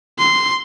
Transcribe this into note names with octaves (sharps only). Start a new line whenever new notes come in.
C6